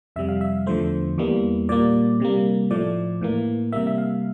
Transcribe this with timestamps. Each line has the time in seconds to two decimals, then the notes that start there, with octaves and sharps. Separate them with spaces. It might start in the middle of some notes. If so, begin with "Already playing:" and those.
0.16 F2 C3 G3 E5
0.29 F5
0.41 E5
0.66 E2 D3 F3 A3 C5
1.18 E2 E3 G3 A#3
1.69 A#2 G3 A#3 D5
2.20 C3 G3 A#3
2.71 A2 F3 A3 D5
3.21 A2 E3 A#3
3.72 C3 G3 A#3 E5
3.87 E5
3.98 F5